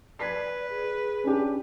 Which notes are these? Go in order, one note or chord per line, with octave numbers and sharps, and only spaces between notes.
B4 D5 G#6 B6 C7
G#4
C#4 D4 G4